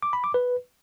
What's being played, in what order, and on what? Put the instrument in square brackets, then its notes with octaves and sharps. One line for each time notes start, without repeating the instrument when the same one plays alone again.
[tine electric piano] D6
B5
D6
B4